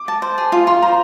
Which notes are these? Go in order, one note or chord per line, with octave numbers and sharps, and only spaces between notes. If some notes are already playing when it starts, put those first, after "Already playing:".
Already playing: D6
A5
C5
G#4
F4
F4 C6
C5 A#5